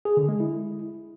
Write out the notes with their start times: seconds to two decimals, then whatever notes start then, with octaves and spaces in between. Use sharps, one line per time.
0.05 G#4
0.17 D3
0.29 G#3
0.40 E4